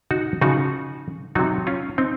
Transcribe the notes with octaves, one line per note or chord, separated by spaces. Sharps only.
D#4 F#4
C#3 F3 D#4 F#4
C3 F#3 D#4 F#4
C#4 F4
C4 D#4